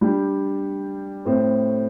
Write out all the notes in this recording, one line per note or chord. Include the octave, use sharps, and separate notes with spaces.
G3 D4 G4
A2 A3 C4